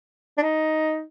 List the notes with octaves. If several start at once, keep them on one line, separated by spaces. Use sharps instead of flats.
D4
D#4